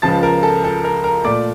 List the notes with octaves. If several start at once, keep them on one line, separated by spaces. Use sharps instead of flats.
C#2 C#3 F3 A5 A6
A#4 A#5
A4 A5
A4 A5
A#4 A#5
A#4 A#5
A#2 A3 D5 D6